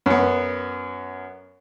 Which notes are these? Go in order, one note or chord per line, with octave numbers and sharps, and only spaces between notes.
F#2 B3